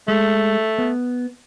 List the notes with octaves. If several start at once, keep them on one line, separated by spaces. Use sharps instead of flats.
G#3 A3
B3